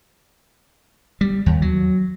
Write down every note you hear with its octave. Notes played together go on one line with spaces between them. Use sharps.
G3
D#2
F#3